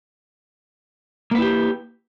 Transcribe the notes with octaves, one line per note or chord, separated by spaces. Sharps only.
A#3 E4 G4 B4